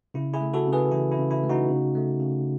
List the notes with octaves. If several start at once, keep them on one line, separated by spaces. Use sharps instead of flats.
C#3 E4
E4 G#4
A3
F#4 A4
C#3
G#4 B4
E3 E4
E4
C#3
E4
A3
D#4 F#4
C#3
A3
C#3